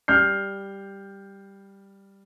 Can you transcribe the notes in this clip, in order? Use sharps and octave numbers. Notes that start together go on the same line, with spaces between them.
G3 F6 G6 C7